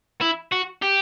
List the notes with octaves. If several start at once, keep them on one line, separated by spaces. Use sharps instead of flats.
E4
F#4
G4